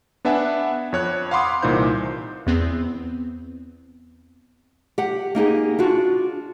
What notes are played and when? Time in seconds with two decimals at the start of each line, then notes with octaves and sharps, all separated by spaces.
0.25 B3 D4 B4 E5 F#5 G#5
0.93 F2 C#5 F#6
1.31 F5 F#5 B5 C6 D6 D#6
1.62 C2 A#2 E3 D#4 C5 G6
2.47 E2 B3 C4
4.98 G4 F#5
5.35 A#3 D#4 G4 G#4
5.79 D4 F4 F#4